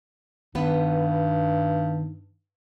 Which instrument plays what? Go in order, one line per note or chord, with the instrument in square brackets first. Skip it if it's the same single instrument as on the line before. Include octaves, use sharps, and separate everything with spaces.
[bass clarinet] G2 [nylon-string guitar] D#3 B3 B4